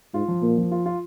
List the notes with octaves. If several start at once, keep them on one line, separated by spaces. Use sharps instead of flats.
G#2 F4
F3
A#2 A#3
F3
F4
F4